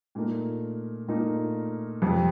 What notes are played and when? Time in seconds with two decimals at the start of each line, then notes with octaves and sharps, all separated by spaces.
0.15 A#2 A3 D#4 A#4
1.08 A#2 A3 D#4 A#4
2.02 F2 C3 F3